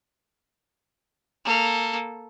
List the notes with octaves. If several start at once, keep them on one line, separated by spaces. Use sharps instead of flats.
A#3 A4